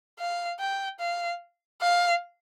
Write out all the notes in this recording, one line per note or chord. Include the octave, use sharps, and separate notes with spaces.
F5
G5
F5
F5